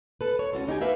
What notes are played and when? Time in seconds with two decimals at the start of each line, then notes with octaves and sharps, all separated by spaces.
0.21 A4 B4
0.39 C#5
0.53 C#4 F4 F#4 A4
0.67 D3 D#4 G4 G#5
0.81 F#4 B4 E5 F5 G5